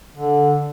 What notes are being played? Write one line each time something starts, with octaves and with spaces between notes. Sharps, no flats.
D3